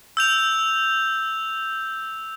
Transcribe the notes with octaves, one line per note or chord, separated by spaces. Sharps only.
E6 G6 F7